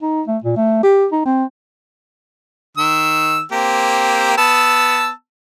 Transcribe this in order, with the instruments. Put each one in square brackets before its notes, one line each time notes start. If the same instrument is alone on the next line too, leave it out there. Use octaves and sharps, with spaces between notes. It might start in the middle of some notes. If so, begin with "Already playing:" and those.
[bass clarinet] D#4
A3
A#2
A3
G4
D#4
C4
[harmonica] D#3 E6
A#3 C4 G4
B3 A5 E6